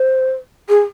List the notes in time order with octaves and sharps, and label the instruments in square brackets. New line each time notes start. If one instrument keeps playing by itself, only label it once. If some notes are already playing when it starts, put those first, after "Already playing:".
Already playing: [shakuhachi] C5
G#4